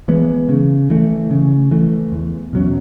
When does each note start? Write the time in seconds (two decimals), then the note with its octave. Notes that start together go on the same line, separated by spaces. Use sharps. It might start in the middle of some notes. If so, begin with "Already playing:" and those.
0.08 E3 G#3 B3
0.49 C#3
0.90 E3 A3
1.31 C#3
1.71 E3 A3
2.12 E2
2.53 B2 F#3 C#4